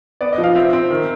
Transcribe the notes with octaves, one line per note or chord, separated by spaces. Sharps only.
B3 D5
D#5
F3
F5
C4 E5
C4
D#3